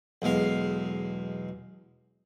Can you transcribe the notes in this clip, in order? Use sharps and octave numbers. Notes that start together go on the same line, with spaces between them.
B1 E2 G#3 F5